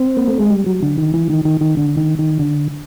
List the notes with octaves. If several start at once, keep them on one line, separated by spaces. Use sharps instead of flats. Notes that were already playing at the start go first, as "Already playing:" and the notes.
Already playing: C4
A#3
A3
G#3
G3
F#3
D3
D#3
E3
D#3
D#3
D#3
D3
D#3
D#3
D3